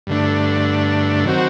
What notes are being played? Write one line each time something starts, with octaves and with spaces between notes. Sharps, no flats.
G2 D3 A3 D4
D#3 F#3 C4 F#4